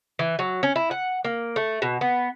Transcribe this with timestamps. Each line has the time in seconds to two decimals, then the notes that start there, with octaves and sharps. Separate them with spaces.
0.19 E3
0.39 F#3
0.63 C#4
0.76 E4
0.91 F#5
1.25 A#3
1.56 A3
1.82 B2
2.01 B3